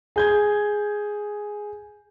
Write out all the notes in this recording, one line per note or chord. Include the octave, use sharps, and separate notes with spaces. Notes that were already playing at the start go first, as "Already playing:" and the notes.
G#4 G6 G#6